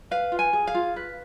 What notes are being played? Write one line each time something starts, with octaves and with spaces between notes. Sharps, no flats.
B4 F5
F4
G#5
G#4
F5
F4
B4